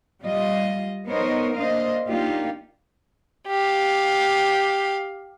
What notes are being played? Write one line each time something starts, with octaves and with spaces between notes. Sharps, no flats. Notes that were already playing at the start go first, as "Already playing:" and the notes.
G3 F4 D#5
B3 D#4 A#4 C5 C#5 D#5
A#3 D4 C5 D#5 F5
A#3 D4 D#4 F4 G4
G4 F5